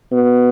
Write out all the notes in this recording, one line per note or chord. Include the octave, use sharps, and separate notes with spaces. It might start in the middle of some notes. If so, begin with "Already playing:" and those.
B2